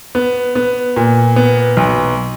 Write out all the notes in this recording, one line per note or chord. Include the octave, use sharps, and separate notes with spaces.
B3
B3
A#2
B3
B1